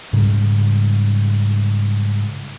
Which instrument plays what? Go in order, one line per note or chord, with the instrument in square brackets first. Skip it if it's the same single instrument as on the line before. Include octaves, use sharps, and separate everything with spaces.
[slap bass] G#2 C#3 G3